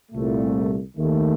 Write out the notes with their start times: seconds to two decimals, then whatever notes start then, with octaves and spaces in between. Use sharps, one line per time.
0.12 C2 A#2 A3
0.97 D#2 D#3 A3